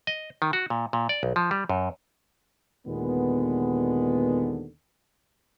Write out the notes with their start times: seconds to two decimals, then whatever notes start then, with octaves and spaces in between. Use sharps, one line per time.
0.07 D#5
0.42 D#3
0.53 F#4
0.70 A#2
0.93 A#2
1.09 D5
1.23 B1
1.36 F3
1.51 G3
1.70 F#2
2.87 D#2 A#2 D3 G#3 B3